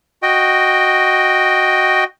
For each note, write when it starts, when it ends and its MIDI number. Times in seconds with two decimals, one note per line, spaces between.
0.22 2.04 66
0.22 2.04 75
0.22 2.04 79